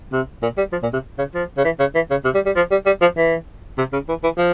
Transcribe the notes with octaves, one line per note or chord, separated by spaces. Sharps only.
C3
A#2
G3
F3
A#2
C3
C#3
F3
C#3
E3
C#3
E3
C#3
C3
G3
G3
F3
G3
G3
F3
E3
C3
C#3
E3
E3
F3